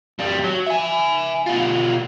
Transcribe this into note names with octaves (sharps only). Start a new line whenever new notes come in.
F2 G3
F#3
E5 G#5
B2 F4